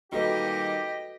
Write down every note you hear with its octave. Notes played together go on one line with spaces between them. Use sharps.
A#2 D#3 G3 F#4 G4 A4 B4 D#5